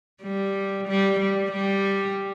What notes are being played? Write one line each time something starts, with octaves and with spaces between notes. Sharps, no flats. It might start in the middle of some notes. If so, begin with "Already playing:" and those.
G3
G3
G3
G3